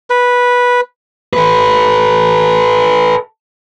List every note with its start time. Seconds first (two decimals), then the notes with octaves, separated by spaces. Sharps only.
0.10 B4
1.33 A4 B4